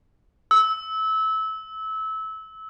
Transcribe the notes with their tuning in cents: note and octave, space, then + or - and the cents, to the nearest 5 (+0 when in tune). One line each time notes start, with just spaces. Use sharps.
E6 -25